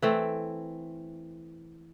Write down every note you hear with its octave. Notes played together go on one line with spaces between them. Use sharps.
E3 A3 C4